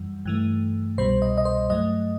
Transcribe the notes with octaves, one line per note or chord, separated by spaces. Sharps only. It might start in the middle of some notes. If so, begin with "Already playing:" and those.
Already playing: F#2 E3 G3
G2 E3 A3
C2 B2 G3 C5
D#5
D#5
C5
G2 F#3 A3 D#5